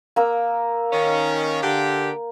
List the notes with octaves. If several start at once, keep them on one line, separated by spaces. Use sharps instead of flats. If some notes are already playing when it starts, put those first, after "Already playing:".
A#3 A#5 E6
D#3 C#4
D3 G4